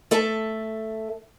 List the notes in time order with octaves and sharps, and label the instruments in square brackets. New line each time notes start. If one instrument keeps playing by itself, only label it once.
[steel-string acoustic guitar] A3 A4 E5 A5